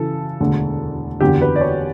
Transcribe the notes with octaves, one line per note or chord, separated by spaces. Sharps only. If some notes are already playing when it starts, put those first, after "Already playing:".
Already playing: C#3 E3 A4
E1 D2 D3
F#1 E2 D3 G4
B4
D5
C#5